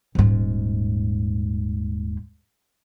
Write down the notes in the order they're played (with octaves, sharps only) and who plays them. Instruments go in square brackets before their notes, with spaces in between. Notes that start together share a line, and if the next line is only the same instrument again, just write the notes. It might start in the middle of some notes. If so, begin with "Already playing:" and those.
[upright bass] D#1 G#2